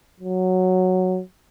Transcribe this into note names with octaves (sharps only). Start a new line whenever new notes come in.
F#3